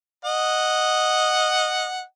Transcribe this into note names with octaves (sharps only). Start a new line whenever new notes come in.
D#5 F#5